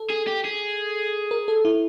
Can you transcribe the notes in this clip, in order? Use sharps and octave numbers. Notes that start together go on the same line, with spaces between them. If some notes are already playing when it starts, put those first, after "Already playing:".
Already playing: A4
G#4
G4
G#4
A#4
A4
E4